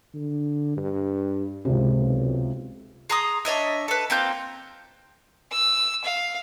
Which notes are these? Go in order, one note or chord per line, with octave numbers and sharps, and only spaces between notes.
D3
G2
G#1 C#2 C3
B1
G#4 A#5 C6 D#6
D4 C#5 D#5 E5
A4 B4
A#3 C4 F4 G6
E6
F5